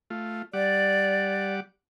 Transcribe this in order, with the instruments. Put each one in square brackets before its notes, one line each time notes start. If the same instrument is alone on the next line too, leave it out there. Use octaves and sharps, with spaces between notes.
[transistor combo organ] A3 F4
[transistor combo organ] G3 F#5 D6 [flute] D5